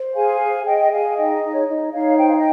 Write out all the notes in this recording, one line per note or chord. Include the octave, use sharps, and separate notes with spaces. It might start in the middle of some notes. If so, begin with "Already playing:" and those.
Already playing: C5
G#4 F5 G#5
G#4
G#4 D#5 G5
G#4 F5 G#5
D#4 D#5 G5
D#5
D#4
C#5
D#4 D#5
D#4 C#5 F5
C5 G5
F5
D#5 G5